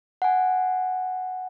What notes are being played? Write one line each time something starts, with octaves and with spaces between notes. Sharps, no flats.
F#5 G#5